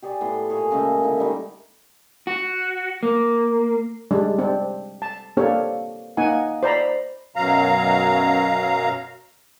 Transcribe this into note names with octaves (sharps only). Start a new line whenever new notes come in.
G4 G#4 C#5 D5
A2 B3 C6
A#2 G#4 C#5
A#2 C#3 G#3 A3
D3 E4
D#3 G3 G#3 A#3
F#4
A#3
G3 G#3 D4
C4 D4
A5
A#3 C4 D4 G4 A4 C#5
A#3 D#4 F#5 G#5
C5 D5 A#5 B5
F#2 B2 F#3 F5 A#5